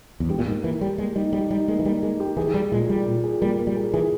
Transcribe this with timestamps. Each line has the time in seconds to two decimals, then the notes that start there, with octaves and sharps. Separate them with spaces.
0.20 E2
0.29 G2 G4
0.39 A#2
0.47 G#2 A#3
0.63 E3 A#3
0.81 G3 G4
0.98 G#3 A#3
1.16 G3 D#4
1.33 G3 G4
1.51 G3 D#4
1.68 G#3 A#3
1.79 E3
1.85 G3 A#3
2.02 G#3 A#3
2.20 G4
2.37 E3 G#4
2.48 E3
2.54 G3 G#4
2.71 A#2 G#3
2.89 G3 G#4
3.06 A#2
3.24 G#4
3.41 G3 A#3
3.58 A#3
3.67 G3
3.76 G#4
3.94 E3 G#4